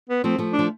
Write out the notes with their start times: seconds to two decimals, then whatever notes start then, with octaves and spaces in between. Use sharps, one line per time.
0.10 B3
0.24 F3 A3 C4
0.38 F3 A3
0.53 D4
0.59 F3